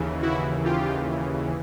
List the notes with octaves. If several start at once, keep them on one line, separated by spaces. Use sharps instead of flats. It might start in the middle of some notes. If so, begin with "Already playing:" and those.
Already playing: D#2 C#3 E3
E4 F#4
F4 G4